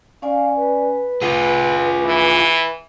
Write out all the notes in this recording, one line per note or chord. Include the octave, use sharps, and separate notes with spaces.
C#4 D5 F5 G#5
B4
F4 G#4 G#5
E3